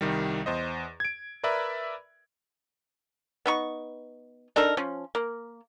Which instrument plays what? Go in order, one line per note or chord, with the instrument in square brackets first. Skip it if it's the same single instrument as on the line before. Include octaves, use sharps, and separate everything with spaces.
[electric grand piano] C2 D#3 G3
E2 C5 D#5
G#6 D7
A#4 B4 D5 E5 B5
[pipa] B3 D#4 C#6
D4 D#4 A4 A#4
F3 C#4
A#3